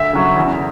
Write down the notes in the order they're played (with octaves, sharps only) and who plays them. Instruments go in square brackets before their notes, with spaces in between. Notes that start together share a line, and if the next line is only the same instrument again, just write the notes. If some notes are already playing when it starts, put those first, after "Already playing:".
Already playing: [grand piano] D2 E5
C#3 F#3 C#4
E2